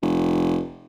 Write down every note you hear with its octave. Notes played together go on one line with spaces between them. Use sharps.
F1